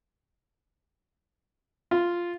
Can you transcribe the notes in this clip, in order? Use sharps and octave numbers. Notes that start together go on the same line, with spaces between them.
F4